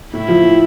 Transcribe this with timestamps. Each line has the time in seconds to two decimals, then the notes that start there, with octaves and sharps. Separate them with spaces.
0.13 A2 E4
0.28 F3
0.44 A2